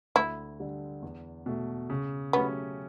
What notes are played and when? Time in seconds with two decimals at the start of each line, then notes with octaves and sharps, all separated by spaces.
0.15 D2 E4
0.60 D3 G3
1.03 E2
1.46 B2 A3
1.90 C#3
2.33 F#3 A3 B3 C#4 G4